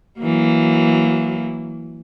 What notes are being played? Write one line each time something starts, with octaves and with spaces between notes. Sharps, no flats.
E3 F#3 A#3